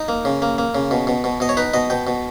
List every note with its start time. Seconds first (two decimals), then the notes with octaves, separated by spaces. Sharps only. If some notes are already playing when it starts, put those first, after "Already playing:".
Already playing: D#4
0.08 A#3
0.25 C#3
0.42 A#3
0.58 A#3
0.75 C#3
0.91 B2
1.07 B2
1.24 B2
1.40 B2 D#5
1.49 C#5
1.57 D#4 B4
1.74 B2 D#5
1.90 B2 G5
2.07 B2